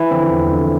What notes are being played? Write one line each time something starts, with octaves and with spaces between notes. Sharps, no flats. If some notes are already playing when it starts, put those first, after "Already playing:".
Already playing: E3 E4
D3 F3 C4
E2
D3 F3